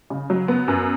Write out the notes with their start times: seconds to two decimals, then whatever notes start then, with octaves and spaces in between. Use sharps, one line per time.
0.10 C#3
0.30 F#3
0.48 B3
0.68 F#2